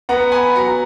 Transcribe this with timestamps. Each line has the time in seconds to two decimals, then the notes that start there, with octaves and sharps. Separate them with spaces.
0.09 B3 F#5 A#5
0.32 G#5 B5
0.55 F#3 F#5 A#5